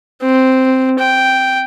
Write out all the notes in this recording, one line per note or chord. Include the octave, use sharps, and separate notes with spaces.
C4
G5